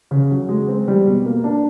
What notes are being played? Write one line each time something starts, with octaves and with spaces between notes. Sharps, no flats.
C#3
F#3
G#3
C4
G3
B2
A#3
D4